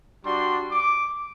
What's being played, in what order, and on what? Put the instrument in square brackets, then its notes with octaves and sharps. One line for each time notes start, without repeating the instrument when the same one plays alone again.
[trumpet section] G3 D4 F#4 C6
D6